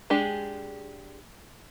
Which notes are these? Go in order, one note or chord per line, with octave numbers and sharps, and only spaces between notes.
G#3 D4 G4 G#4